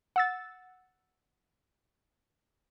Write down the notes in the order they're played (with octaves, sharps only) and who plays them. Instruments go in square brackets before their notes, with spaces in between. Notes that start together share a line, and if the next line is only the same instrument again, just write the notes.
[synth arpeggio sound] F#5 E6 A6